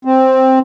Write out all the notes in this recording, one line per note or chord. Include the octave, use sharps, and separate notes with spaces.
C4